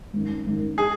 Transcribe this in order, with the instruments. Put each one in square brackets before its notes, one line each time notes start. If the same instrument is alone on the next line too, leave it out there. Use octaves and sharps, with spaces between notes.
[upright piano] G#1 F#2 D#3
G#1 F#2 D#3
[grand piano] G#4